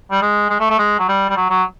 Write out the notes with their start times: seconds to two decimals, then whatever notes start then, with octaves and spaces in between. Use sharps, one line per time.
0.11 G3
0.22 G#3
0.50 G#3
0.60 A3
0.70 A3
0.78 G#3
0.99 F#3
1.08 G3
1.29 G3
1.36 F#3
1.50 F#3